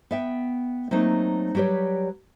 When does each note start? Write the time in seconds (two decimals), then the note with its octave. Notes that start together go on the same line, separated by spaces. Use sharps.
0.11 B3 E5 G5
0.91 F#3 A3 A#3 C4 D#4
1.55 F#3 G3 G4 B4 C#5